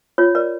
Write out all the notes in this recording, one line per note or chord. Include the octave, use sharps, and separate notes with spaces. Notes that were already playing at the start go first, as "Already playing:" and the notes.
F4 C#5
A#4 C#5 D5